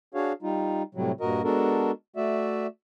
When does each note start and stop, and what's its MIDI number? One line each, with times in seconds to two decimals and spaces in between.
0.15 0.32 62
0.15 0.32 66
0.15 0.32 68
0.15 0.32 73
0.15 0.32 77
0.42 0.82 55
0.42 0.82 63
0.42 0.82 65
0.95 1.12 45
0.95 1.12 48
0.95 1.12 54
0.95 1.12 55
1.21 1.42 43
1.21 1.42 46
1.21 1.42 66
1.21 1.42 70
1.21 1.42 75
1.44 1.91 56
1.44 1.91 59
1.44 1.91 62
1.44 1.91 66
1.44 1.91 69
1.44 1.91 70
2.16 2.67 57
2.16 2.67 66
2.16 2.67 74
2.16 2.67 76